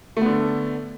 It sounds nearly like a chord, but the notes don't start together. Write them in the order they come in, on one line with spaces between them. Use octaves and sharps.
A3 B3 D3